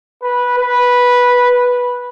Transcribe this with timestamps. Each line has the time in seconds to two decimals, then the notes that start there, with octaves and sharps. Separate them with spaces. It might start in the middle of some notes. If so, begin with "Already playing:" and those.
0.22 B4
0.58 B4